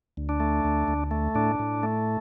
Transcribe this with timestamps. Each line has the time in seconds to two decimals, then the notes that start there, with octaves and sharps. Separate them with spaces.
0.17 D2
0.29 D4
0.40 A3
0.65 D2
0.88 D2
1.11 A3
1.35 A2 D4
1.59 A2
1.83 A3